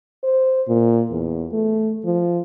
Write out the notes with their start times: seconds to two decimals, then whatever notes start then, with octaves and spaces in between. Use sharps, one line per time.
0.23 C5
0.68 A#2
1.11 E2
1.52 A3
2.05 F3